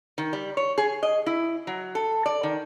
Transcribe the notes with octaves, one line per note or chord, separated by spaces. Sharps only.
D#3
G3
C#5
G#4
D#5
E4
F#3
A4
D5
D#3